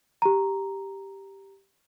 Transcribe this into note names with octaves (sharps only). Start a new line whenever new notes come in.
G4 A#5